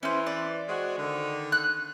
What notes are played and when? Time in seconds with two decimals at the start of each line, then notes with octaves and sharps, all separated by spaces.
0.03 E3 C#4 C5
0.26 D5
0.69 G#3 C4 F#4
0.98 D3 D#3
1.52 F#6